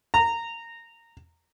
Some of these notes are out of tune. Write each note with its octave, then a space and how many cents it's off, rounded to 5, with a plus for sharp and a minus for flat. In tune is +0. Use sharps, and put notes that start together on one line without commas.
A#5 -15